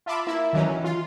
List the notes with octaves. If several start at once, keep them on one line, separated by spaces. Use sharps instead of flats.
F4 E5 A5 B5 D6
A#3 E4 E5
D#3 E3 F#3 C#4
F4